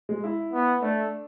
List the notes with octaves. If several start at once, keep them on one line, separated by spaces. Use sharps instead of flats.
G#3
E4
B3
A3 D4